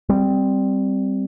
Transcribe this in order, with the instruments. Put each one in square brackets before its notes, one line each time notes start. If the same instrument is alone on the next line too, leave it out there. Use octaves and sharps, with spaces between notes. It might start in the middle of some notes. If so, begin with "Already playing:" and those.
[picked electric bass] G3 C4